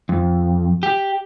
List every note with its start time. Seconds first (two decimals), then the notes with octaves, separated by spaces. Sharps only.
0.09 F2
0.83 G4